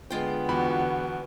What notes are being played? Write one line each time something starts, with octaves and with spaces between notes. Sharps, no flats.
D3 G#3 B3 F4 G5
E2 F#4 B5